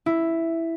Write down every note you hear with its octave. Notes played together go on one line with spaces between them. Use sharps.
E4